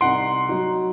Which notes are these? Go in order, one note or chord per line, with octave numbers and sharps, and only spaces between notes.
C2 D#4 F#5 C6 D7
F#3 D#4